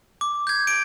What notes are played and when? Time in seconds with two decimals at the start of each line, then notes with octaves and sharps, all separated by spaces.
0.21 D6
0.47 G6 G#6
0.67 D7